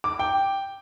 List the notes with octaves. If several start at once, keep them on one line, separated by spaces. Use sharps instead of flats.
D6
G5